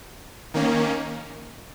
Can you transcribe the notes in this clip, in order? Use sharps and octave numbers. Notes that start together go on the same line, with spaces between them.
D#3 A#3 C#4